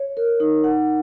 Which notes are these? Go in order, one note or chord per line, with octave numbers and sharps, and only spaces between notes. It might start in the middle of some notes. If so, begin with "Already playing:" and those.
Already playing: C#5
A#4
D#4
F#5